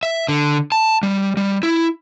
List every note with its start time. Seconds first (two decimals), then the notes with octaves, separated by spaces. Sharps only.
0.03 E5
0.28 D3
0.72 A5
1.03 G3
1.37 G3
1.63 E4